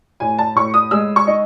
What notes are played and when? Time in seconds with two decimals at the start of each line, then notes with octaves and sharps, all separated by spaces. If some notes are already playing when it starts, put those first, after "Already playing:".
0.20 A2 G#5
0.38 A5
0.56 A2 C#6
0.74 D#6
0.91 G#3 E6
1.16 C#6
1.27 D#4